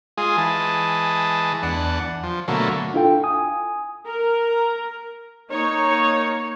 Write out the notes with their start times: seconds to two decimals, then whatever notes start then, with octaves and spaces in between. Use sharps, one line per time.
0.18 G#3 F4 G#4
0.38 E3 G#3 A5
1.63 E2 D4 F#5
2.23 F3
2.48 B2 D3 F#3 A3 A#3
2.94 D4 E4 F4 A4 F5 G5
3.24 G#5 D#6
4.06 A#4
5.51 A#3 D#4 C#5